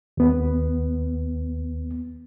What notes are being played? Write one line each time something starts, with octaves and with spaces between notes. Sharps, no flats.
D#2 B3